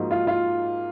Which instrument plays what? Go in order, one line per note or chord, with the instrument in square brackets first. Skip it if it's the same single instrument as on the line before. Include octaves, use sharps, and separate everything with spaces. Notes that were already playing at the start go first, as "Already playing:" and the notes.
Already playing: [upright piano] G#2 F3 A#3 D#4 F#4
[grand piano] F4
F4